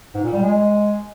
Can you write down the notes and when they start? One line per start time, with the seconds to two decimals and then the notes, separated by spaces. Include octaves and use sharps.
0.15 G#2
0.24 A#2
0.33 G3
0.42 G#3